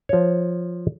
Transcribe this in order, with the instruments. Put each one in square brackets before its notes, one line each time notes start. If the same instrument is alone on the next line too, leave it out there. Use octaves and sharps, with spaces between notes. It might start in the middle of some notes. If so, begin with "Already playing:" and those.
[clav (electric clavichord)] F3 C#5